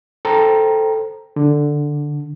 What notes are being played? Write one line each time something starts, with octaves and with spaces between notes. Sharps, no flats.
A4 C5 G5 A#5
D3